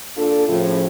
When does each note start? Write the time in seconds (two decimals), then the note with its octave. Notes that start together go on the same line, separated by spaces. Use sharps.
0.17 A#2 D4 F4 A4
0.48 A2 C#3 F3